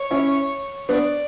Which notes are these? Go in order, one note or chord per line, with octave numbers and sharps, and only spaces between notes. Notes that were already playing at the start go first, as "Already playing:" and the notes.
Already playing: C#5
C#4 E4
B3 D4 D5